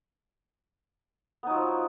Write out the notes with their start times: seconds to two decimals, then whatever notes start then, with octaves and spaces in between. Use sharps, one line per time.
1.43 B3
1.47 D#4
1.50 F#3
1.54 F3